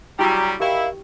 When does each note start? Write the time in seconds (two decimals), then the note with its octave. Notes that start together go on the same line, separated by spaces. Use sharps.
0.19 C#3 F#3 G3 E4 F#4 G4 A#5 E6
0.60 D#3 E4 G4 F5 G5